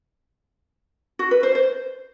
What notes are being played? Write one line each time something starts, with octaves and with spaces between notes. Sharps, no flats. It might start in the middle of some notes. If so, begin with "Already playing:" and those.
F#4
B4
C5
C5